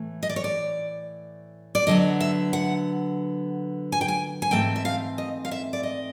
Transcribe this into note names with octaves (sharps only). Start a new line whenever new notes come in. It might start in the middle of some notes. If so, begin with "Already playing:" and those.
Already playing: A2 E3 A3
D#5
D5
C#5
D5
D5
D3 F#3 B3 D#5
E5
F#5
G#5
G5
G#5
G#5
G#2 E3 A3 C4 G5
E5
F5
D#5
F5
E5
D5
D#5